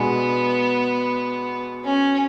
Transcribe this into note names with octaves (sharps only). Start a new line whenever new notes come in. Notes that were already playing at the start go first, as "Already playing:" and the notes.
Already playing: B2 G#3 B3 D4
C#4